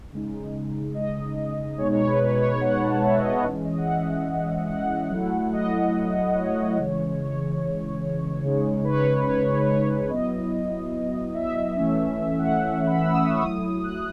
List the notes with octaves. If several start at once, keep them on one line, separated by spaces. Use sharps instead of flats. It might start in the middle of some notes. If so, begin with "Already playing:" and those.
C#3 G#3 D#4
D#5
B2 G#3 D#4 C#5
C#5
B4
C#5
B4
C#5
F#5
A5
E5
D#5
D#5
E3 G#3 C#4
D#5
F#5
E5
F#5
F#3 A3 E4
D#5
C#5
C#3 E3 G#3
C#5
C#3 G#3 D#4
B4
C#5
B4
C#5
B4
C#5
B4
C#5
B4
C#5
C#5
F#3 B3 E4 D#5
E5
E3 A3 C#4
F#5
B5
E6
D#6
C#6
D#6
F#3 A3 E4
F#6